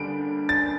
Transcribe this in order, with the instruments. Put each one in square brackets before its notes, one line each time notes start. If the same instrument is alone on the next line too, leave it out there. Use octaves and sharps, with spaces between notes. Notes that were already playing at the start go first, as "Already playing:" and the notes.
Already playing: [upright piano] D3 G3 D4 D7
A6